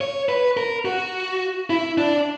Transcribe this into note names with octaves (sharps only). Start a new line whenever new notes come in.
C#5
B4
A#4
F#4
E4
D4